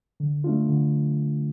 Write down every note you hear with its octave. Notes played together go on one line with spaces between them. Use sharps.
D3
A3 D4 F4
D3